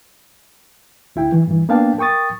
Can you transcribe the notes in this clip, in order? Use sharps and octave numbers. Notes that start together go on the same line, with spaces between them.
D2 E4 G5
E3
G2 E3
A#3 B3 D4 F5 G5 A5
A#4 G5 C#6 D#6 A6